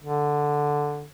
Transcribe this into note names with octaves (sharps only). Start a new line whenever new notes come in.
D3